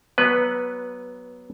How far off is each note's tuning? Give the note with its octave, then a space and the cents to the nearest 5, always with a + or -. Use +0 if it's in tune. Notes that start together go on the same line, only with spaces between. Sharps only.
F#3 +15 B3 -15 B4 +0